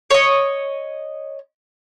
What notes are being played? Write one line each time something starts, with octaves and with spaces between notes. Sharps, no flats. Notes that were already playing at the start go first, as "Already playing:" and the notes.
C#5 D#5